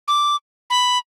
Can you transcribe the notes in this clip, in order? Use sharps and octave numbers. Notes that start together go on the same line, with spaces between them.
D6
B5